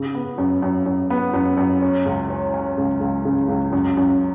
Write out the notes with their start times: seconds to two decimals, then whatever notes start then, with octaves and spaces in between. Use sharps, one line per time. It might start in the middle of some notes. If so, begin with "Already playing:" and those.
Already playing: C#3
0.15 B3
0.38 F#2
0.62 F#2
0.86 F#2
1.10 B3
1.33 F#2
1.57 F#2
1.82 C#4
2.06 C#2
2.30 C#4
2.54 C#4
2.78 C#2
3.01 C#2
3.25 C#3
3.49 C#2
3.73 F#2
3.97 F#2